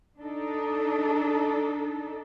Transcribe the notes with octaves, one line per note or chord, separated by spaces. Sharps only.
D4 D#4 A4